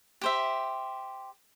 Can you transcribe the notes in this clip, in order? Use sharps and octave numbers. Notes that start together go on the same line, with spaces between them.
G4 C5 E5